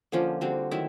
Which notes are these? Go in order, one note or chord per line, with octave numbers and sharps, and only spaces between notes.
D3 F3 A#3 C#4
D3 G3 C4 F#4
D#3 F#3 A3 E4